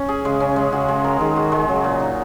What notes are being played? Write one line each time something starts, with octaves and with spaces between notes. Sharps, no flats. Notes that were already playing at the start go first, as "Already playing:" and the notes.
Already playing: C#4
G#4
C#3 G#3
C#4
G#3
C#3 F#4
G#3
A#4
D#3 G#3
F#4
G#3
C#3 F#3
A#2
D#4